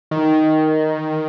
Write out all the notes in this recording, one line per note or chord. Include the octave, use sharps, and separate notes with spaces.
D#3